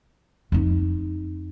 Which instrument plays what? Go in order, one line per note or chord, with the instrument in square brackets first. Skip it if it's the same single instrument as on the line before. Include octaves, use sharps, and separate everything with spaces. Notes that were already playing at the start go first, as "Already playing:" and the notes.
[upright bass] F2 D#4